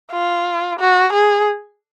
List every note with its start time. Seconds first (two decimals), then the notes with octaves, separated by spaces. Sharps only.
0.12 F4
0.79 F#4
1.13 G#4